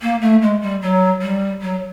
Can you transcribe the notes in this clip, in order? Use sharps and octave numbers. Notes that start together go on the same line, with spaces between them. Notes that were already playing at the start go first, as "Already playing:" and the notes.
A#3
A3
G#3
G3
F#3
G3
F#3